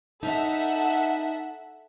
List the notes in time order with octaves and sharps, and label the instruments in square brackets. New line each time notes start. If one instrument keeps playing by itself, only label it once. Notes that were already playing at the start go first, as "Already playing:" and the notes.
[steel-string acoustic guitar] D#4 [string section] A4 E5 F#5